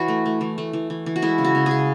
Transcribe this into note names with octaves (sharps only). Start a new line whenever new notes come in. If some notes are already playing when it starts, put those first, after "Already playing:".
Already playing: E3 F#4 B4 C#5
A3
A3
E3
A3
E3
E3
E3
F#4
G#3 E4
C#3
F#4
C#3
C#3 G#4